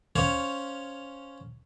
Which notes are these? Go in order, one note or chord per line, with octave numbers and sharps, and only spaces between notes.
C#4 C5 C#5 F5